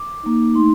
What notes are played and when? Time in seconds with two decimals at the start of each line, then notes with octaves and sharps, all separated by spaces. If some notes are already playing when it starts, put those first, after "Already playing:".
Already playing: D6
0.23 A#3 D#4
0.55 A3 D#4 C6